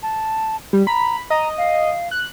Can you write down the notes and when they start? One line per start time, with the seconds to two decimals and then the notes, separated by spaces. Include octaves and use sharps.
0.03 A5
0.73 G3
0.87 A#5 B5
1.30 D#5 A#5
1.58 F5
2.11 F#6